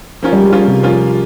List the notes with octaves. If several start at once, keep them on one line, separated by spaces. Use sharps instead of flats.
F3 A#3 C#4 F4
G3
G#3
F3 G3 A#3 C#4 F4
C3
F3 A#3 C#4 F4